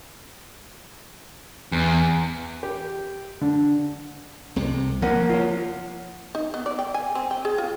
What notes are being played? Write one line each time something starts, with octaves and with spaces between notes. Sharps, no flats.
E2
G4
D3
C2 C3
F3 A#3 A#4 F#5
F4 C#5
D#4
B3
D5
G5
G#5
C4
G5
G#4
F4